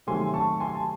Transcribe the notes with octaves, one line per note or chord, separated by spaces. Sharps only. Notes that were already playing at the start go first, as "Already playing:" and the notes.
C3 D#3 F#3 A3 G#5 C6
A5 C#6
G#5 C6
A5